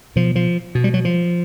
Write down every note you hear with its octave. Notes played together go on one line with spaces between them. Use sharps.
B2 F3
F3
B2
G3
F#3
F3